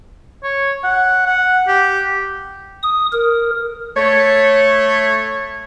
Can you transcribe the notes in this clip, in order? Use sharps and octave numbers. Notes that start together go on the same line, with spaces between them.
C#5
F#5
F#5
G4
D#6
A#4
A3 C#5